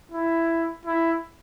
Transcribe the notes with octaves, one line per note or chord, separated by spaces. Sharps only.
E4
E4